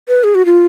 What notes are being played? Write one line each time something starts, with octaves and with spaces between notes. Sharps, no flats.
B4
G#4
F#4
F4